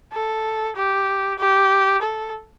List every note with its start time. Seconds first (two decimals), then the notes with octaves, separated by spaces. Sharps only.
0.13 A4
0.76 G4
1.39 G4
2.02 A4